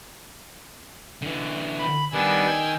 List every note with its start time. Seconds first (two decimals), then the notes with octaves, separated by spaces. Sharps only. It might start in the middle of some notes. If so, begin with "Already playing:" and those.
1.22 D3 E3
1.78 B5
2.13 D#3 G3 B3 D4 G#5 E6
2.46 G5